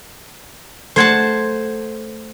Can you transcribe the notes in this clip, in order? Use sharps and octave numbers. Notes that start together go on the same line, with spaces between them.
A3 C5 F#5 A5 G#6